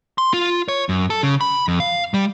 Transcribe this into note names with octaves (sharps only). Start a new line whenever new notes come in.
C6
F4
C#5
F#2
A4
C#3
B5
F2
F5
G3